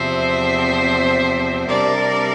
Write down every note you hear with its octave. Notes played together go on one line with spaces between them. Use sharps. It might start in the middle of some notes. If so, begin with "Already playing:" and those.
Already playing: E2 C3 F3 C4 C5 E5
C3 G3 D4 A#4 D5